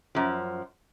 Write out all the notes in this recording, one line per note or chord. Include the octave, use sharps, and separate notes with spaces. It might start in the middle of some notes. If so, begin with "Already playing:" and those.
F#2 F3